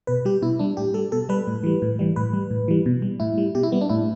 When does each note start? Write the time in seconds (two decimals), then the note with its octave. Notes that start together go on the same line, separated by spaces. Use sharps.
0.07 B2 B4
0.25 G3 G4
0.42 B2 E4
0.59 G3 D4
0.77 A2 G4
0.94 G3 A4
1.12 B2 A4
1.29 G3 B4
1.47 A2
1.63 E3 G3
1.82 A2
1.99 E3 G3
2.16 A2 B4
2.33 G3
2.50 A2
2.68 E3 G3
2.86 B2
3.02 G3
3.20 A2 E4
3.38 G3
3.55 B2 G4
3.63 E4
3.72 G3 B3
3.81 D4
3.89 A2 E4